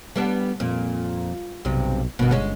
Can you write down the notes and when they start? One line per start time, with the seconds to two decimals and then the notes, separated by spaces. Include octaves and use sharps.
0.16 G3 B3 D4
0.60 F2 A#2
1.65 B1 G2 C3
2.19 G1 B2 D#3
2.31 G#3 C#4